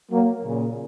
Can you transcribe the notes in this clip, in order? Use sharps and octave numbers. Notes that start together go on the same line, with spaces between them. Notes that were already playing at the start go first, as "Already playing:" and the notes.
F#3 A#3
A#2 C#3